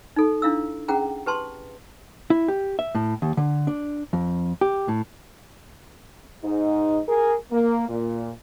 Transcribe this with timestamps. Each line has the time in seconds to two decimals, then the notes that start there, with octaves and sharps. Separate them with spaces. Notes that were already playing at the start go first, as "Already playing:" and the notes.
0.16 D#4 A4
0.42 D4 E4 F5 E6
0.88 C#4 G#4 F#5 G5 A#5
1.26 G4 B4 A5 C6
2.30 E4
2.48 G4
2.79 E5
2.95 A2
3.22 D#2
3.37 D3
3.67 D4
4.13 F2
4.61 G4
4.88 A2
6.43 G#2 D#4
7.08 G#4 A#4
7.52 A#3
7.88 A#2